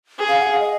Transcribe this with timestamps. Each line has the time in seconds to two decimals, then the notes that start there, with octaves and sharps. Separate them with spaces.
0.18 G#4
0.29 F5
0.40 F#5
0.50 F5
0.60 D#5